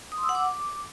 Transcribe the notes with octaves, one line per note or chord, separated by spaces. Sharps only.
D#6
C6
E6
F#5
D6